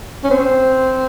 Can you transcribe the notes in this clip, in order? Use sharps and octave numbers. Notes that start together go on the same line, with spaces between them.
C#4
C4